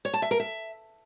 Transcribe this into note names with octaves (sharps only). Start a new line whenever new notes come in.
C#5
A5
E5
A#4
E5